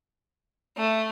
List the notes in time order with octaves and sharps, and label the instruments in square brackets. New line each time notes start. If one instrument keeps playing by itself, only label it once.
[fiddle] A3